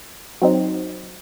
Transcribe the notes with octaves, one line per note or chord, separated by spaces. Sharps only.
F#3 C4 D#4